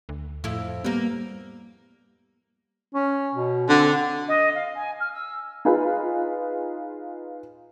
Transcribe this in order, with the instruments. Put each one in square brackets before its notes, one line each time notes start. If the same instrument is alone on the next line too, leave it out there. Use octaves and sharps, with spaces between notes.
[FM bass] D2
[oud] F2 E4 [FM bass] A2
[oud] G3 A#3 [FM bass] B3
[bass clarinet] C#4
B2
[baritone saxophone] D3 [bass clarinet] C4
[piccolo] D#5
F5
G#5
F6
E6
[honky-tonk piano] D#4 F4 G#4 B4